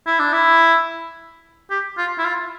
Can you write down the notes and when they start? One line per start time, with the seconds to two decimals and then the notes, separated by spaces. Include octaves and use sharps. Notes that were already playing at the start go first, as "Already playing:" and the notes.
0.06 E4
0.19 D4
0.33 E4
1.70 G4
1.98 F4
2.18 E4
2.25 F4